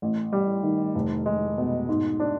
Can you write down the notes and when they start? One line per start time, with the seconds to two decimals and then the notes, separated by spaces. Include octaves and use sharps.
0.02 A1
0.33 G3
0.63 D#3
0.95 F1
1.26 G#3
1.58 B2
1.89 G#2
2.20 D4